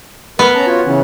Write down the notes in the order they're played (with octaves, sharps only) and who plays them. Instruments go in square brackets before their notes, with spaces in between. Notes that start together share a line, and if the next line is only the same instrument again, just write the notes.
[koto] B3 [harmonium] A#4
[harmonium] C#4 A5 A#5
F4 F#4 C#5
C#3 E3 C#4